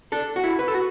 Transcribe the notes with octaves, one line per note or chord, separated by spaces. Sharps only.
D4 A4
F#4
E4
B4
A4
F#4